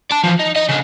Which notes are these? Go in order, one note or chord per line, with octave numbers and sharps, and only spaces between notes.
D5 A5
E3 F3
D#4
D#4 D#5
C#3 D4